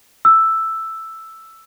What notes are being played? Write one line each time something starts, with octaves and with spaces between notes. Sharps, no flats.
E6